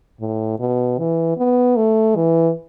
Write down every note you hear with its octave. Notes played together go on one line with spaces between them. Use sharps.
A2
B2
E3
B3
A3
E3